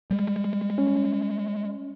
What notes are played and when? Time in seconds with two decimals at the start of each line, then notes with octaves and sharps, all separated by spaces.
0.11 G3 G#3
0.78 C#4